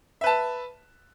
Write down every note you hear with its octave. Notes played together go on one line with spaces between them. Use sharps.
B4 E5 A5